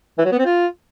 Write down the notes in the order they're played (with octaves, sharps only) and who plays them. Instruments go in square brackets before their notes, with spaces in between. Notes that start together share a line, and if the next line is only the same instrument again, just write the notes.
[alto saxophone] E3
F#3
B3
C4
F4